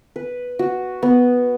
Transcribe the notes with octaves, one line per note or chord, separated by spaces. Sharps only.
B4
F#4
B3